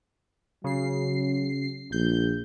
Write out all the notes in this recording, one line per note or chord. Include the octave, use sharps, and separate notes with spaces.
C#3 F#3 C7
A#1 G6